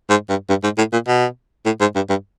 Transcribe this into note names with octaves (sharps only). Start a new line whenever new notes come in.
G#2
G2
G2
G#2
A2
A#2
B2
A2
G#2
G2
G2